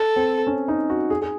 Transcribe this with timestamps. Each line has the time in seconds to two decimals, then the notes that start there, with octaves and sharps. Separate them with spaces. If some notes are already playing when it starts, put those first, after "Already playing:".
Already playing: A4
0.16 C4
0.47 C#4
0.68 D#4
0.90 F#4
1.10 G#4
1.22 G#4